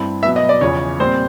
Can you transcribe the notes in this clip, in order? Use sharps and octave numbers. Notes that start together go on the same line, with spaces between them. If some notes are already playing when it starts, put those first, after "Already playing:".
Already playing: G2 C4 E4
B2 F#3 B3 E5
D#5
D5
E2 C#3 F3 C#5
A#2 G3 C4 C5